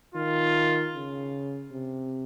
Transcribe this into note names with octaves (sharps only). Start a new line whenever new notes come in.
D#3 F4
C#3
C3